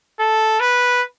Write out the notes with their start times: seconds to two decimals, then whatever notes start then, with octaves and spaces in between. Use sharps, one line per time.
0.20 A4
0.60 B4